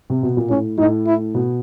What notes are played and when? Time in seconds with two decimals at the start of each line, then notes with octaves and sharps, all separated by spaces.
0.10 C3
0.23 B2
0.37 A#2
0.50 A2 C#4
0.78 A2 D#4
1.07 E4
1.35 B2